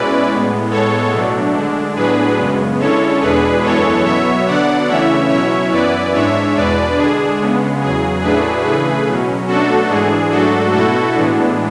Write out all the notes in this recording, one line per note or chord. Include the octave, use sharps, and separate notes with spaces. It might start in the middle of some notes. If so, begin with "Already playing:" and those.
Already playing: B2 G#3 C#4 E4 B4 D5
A2 G#3 B3
A2 G#3 B3 A4 C#5
B2 F#3 A3 D4
D3 G#3 D4
A2 F#3 B3 D4 G#4 B4
F#2 C#3 G#3 B3
D3 G#3 C#4 E4 A4 C#5
E2 B2 G#3 D4 G#4 B4
F#2 E3 G#3 B3 E4 A4 C#5
B2 F#3 B3 C#5 E5
D3 F#3 B3 D4 D5 F#5
C#3 E3 A3 C#4 E4 C#5 E5
B2 F#3 C#4 E4 C#5 E5
F#2 E3 B3 E4 B4 D5
G#2 G#3 D4 C#5 E5
E2 B2 G#3 D4 B4 D5
D3 G#3 D4 G#4
C#3 G#3 B3
E2 C#3 F#3 G#4
A2 F#3 A3 D4 G#4 B4
C#3 E3 A3 G#4 B4
B2 F#3 C#4
B2 F#3 A3 D4 F#4 A4
G#2 E3 G#3 D4 G#4
G#2 F#3 A3 D4 F#4 A4
B2 A3 E4 F#4 A4
A2 E3 G#3 B3 D4